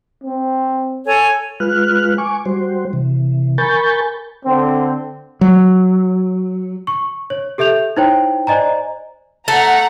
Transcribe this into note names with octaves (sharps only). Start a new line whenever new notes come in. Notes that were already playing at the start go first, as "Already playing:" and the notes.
C4
A4 C#5 G#5
G#3 F4 B4 F6 F#6
G#5 C#6 D6
G3 F#4 C5
C3 E3
A#4 G#5 B5 C#6 G6 A6
D3 C4
F#3
C#6
C#5
G4 A4 E5 G6 F7
D#4 E4 C5 C#5 G5
C5 D5 D#5 G#5 A#5
A3 F#5 A#5